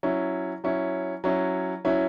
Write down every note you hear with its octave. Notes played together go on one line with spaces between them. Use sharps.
F#3 C#4 E4
F#3 C#4 E4
F#3 C#4 E4
F#3 C#4 E4